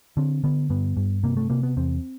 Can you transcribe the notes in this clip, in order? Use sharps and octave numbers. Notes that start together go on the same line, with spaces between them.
D3 C4
D3 B3
G2 B3
G2
C3 A#3
A3
C3 A#3
B3
E2 C4